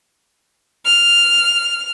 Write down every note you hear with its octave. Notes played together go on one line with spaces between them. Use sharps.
F6